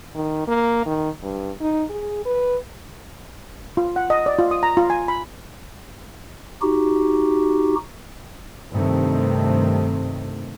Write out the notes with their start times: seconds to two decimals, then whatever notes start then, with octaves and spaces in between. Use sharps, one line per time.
0.15 D#3
0.48 A#3
0.86 D#3
1.22 G2
1.60 D#4
1.90 G#4
2.25 B4
3.77 F4
3.96 F#5
4.10 D#5
4.26 D5
4.39 F4
4.51 D#6
4.63 A#5
4.77 F4
4.90 G#5
5.08 B5
6.62 D#4 F#4 G4
8.71 G2 C3 D#3 A3 C4